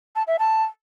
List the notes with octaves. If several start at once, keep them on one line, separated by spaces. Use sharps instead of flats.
A5
E5
A5